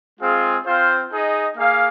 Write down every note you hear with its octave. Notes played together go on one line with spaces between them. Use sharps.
G#3 C4 F4 G#4 F5
C4 F4 C5 F5
D#4 G#4 D#5
A#3 G#4 F5